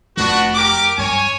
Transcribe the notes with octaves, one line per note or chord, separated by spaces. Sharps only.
F1 B3 D4 F#4
G4 A#4 D6
G2 C#5 G#5